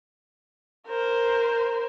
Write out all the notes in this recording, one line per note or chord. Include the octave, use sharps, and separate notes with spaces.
A#4 C5